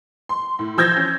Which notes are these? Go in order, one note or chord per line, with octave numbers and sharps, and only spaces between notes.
C6
A2
F3 E6 G6 G#6 A#6
C#4